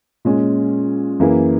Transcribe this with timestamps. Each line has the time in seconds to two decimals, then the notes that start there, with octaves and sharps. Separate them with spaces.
0.25 A#2 G#3 C#4
1.20 F#2 E3 A#3 E4 G#4